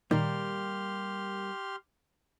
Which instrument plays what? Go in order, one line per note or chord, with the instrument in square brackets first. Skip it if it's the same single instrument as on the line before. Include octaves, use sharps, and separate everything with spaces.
[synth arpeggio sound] A#2 D#3 [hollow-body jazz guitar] G3 A#3 [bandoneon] G4 C6 F6